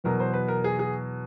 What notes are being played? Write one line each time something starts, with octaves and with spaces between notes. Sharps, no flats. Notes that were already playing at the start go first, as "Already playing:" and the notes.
E2 B2 F#3 A#4
C5
B4
A#4
G#4
G#4